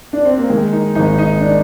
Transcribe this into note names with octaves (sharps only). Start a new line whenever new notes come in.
D4
C4
A#3
D#3 G#3
D#4
G#1 D#4
D#4
D4